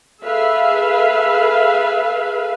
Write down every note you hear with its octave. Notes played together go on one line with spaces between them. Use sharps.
G#4 A4 B4 E5 F5